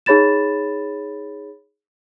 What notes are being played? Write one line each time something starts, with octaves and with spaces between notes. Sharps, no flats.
D#4 G#4 C#5 B5 A6 E7